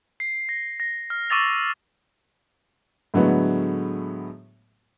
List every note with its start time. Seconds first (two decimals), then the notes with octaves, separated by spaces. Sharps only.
0.20 C7
0.49 A#6
0.80 A#6
1.10 F6
1.30 C#6 D6 E6 A6 F7
3.14 A2 D3 F#3 G#3 A3 B3